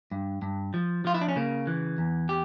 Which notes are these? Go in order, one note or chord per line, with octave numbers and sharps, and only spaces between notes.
G2
G2
F3
F3 F4
E4
D4
C#4
C#3 A#3
E3
E2
G4